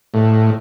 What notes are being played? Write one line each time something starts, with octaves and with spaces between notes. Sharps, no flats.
A2